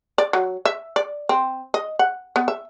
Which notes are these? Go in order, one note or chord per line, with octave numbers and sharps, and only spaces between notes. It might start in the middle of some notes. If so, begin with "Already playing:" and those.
D5
F#3
E5
D5
C4
D#5
F#5
B3
E5